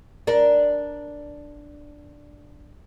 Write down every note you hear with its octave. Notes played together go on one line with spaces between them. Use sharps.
D4 A#4